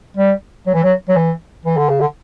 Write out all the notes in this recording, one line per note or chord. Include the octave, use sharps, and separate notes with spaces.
G3
F#3
E3
F#3
F#3
E3
E3
D3
C#3
D3